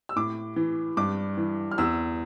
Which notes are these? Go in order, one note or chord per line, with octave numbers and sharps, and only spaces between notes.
E6
A2 D6
E3
G2 D6
E3
F6
E2 E6